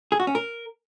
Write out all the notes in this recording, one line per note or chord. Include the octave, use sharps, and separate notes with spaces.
G#4
F#4
C#4
A#4